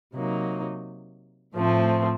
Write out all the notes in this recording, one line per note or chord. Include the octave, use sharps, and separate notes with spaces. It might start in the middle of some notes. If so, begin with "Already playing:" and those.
C3 F#3 A#3 D#4
A2 F3 A3 C4